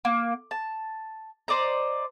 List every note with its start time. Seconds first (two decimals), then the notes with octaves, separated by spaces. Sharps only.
0.05 A#3
0.51 A5
1.48 C5 D5 D#5 A#5